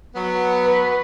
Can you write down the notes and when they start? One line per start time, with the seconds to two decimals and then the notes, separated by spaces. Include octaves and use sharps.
0.15 F#3 B3
0.63 B4